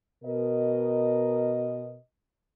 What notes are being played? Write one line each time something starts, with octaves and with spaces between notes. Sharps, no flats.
B2 A#4 D#5